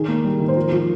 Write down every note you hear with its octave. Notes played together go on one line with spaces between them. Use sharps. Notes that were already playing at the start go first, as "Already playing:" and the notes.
Already playing: D#3 G#4
A#3
G3
D#3
C5
F3 A#4
F3